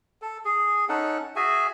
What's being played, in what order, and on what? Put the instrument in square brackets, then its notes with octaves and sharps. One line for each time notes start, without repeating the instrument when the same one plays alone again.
[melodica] A4
G#4
C#4 D#4 A4 F#5
F#4 G#4 E5 G#5